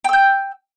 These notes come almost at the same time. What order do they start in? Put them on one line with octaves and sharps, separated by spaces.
G5 E6 G6